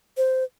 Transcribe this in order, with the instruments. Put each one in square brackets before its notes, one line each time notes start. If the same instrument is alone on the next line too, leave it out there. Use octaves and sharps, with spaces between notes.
[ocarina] C5